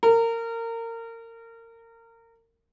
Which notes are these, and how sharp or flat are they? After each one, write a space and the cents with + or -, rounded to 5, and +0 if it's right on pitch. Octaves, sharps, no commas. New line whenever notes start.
A#4 -25